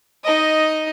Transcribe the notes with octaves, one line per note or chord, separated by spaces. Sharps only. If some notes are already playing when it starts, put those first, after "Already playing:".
D#4 D#5